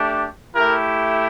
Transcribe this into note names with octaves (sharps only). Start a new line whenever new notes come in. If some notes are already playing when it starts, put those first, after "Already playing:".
Already playing: A3 D4 G4
A3 E4 G4 A#4